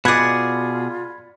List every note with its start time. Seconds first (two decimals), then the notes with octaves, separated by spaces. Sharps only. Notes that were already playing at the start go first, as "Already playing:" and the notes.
0.05 B2 F4 G#4 D5 F#5 B5 G#6